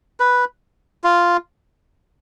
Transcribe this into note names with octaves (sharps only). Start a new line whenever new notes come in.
B4
F4